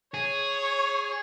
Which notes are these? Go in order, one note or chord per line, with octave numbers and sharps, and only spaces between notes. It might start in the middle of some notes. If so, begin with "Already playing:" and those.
G#4 C#5